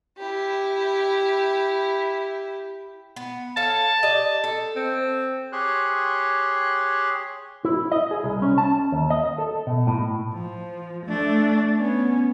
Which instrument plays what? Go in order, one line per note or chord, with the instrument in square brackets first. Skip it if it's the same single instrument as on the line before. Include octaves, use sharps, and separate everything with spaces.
[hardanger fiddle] E4 G4
[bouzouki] B3
[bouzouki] C#4 A4 F5 [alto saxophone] A5
[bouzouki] G4 D5 D#5
A4
[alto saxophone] C4
[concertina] G4 G#4 C#5 C6 F#6
[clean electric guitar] E4
D#5
G#4
C2
C#4
A5
D#2
D#5
A4
B2
A2
[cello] F3
A3 D4
B3 C#4